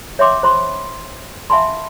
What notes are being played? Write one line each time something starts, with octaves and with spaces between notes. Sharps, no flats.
C#5 E5 F5 G5 C6 D6
C5 B5 C6
E5 F5 G#5 A5 B5 C6